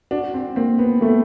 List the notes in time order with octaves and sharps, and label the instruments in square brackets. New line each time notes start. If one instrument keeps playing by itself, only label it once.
[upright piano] D4 [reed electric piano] F#4
[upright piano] C4
[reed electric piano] A#3 [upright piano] C4
[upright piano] B3
[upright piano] A3 [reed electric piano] A#3